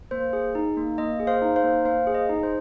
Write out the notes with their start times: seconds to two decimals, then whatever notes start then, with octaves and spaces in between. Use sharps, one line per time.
0.11 A#3 C5
0.33 G#4
0.55 D#4
0.77 A#3
0.98 A#3 D#5
1.20 G#4
1.27 C5 F5
1.42 D#4
1.56 C5 F5
1.64 A#3
1.85 A#3 C5 F5
2.07 G#4
2.15 D#5
2.29 D#4
2.43 C5